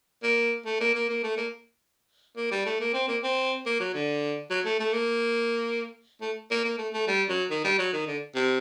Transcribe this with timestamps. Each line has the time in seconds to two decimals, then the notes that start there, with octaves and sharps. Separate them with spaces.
0.23 A#3
0.66 A3
0.80 A#3
0.95 A#3
1.09 A#3
1.23 A3
1.37 A#3
2.37 A#3
2.51 G3
2.66 A3
2.80 A#3
2.94 C4
3.08 A#3
3.23 C4
3.66 A#3
3.80 F#3
3.94 D3
4.50 F#3
4.65 A3
4.80 A3
4.93 A#3
6.21 A3
6.51 A#3
6.64 A#3
6.78 A3
6.93 A3
7.08 G3
7.29 F#3
7.50 D#3
7.64 G3
7.78 F#3
7.93 D#3
8.07 D3
8.35 C3